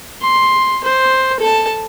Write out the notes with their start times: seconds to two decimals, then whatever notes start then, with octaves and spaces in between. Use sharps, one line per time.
0.22 C6
0.84 C5
1.39 A4 A5